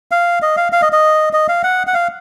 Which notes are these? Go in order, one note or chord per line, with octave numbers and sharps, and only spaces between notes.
F5
D#5
F5
F5
D#5
D#5
D#5
F5
F#5
F#5
F5